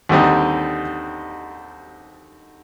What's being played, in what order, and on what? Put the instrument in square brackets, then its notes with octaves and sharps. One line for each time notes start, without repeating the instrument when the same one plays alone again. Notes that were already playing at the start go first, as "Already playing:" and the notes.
[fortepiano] D#2 D3 G3 C4 D#4